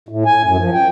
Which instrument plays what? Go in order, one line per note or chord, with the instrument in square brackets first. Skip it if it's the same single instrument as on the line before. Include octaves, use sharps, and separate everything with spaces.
[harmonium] A2
G#5
F#2
F3
G5